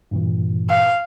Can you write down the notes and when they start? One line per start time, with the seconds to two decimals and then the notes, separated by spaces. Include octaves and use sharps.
0.11 G2 A#2 E3
0.70 F5